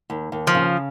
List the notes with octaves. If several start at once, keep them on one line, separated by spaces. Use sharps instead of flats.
D#2
D#2
F3
C#3